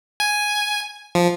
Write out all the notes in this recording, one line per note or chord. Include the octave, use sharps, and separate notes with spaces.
G#5
F3